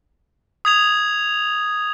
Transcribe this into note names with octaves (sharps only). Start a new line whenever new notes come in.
D#6 G#6 F7